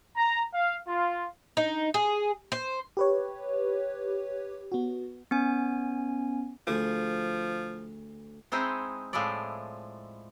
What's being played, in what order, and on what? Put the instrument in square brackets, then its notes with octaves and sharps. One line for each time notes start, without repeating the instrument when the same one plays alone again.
[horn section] A#5
F5
F4
[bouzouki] D#4
G#4
C5
[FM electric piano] G4 B4 C#5
B3 F#4
[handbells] B3 C#4 G#5
[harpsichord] D2 G#4 [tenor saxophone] F3
[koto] G#3 C4 D#4 E4 G#4 C5
A2 F3 G#3 A3 E4 D5